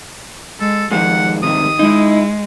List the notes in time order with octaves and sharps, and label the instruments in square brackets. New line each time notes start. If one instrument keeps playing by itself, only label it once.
[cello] G#3 [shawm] A4
[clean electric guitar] D#3 G3 G#3 [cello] F3 [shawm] F#5
[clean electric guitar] G#2 C3 G3 [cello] D#3 [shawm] D#6
[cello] G#3 [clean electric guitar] D#4 E4